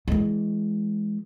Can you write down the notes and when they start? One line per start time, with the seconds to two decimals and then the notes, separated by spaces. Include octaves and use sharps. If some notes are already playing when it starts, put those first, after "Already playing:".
0.08 E3 G#3